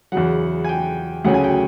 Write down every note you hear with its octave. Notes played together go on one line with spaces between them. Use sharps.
E2 C#3 F#3 F#5
G#5
G5
D2 C#3 F#3 A3 C#4 F#5
G#5
G5